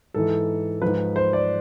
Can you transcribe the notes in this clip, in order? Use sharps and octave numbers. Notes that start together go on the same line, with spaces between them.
G#2 E3 A4
G#2 F3 B4
C5
D5